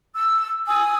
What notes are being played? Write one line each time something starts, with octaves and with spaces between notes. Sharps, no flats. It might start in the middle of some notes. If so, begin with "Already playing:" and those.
E6
G#5 D#6 E6